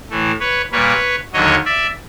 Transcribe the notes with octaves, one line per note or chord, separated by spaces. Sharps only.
A2 E3 A3
B4 C#5
A#2 G3 A#3 B4 C#5
D#2 D3 F#3 C#5 D#5
D5 E5